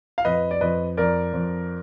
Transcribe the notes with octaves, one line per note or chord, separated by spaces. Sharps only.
F5
F2 B4 D#5
D5
F2 B4 D#5
F2 A#4 D5
F2